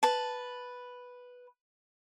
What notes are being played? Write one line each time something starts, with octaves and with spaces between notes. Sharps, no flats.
B4 A5